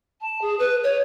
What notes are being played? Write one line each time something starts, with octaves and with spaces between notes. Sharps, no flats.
A5
G#4
B4
C#5